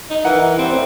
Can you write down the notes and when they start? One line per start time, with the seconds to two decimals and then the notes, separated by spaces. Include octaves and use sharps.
0.10 D#4
0.25 E3 A#4 F#5
0.58 G3 C4
0.72 A2 E4